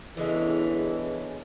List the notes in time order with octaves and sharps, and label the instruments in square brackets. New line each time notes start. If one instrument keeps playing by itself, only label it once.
[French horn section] E2 G#4 [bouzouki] D3 G#3 C#4 [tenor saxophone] E3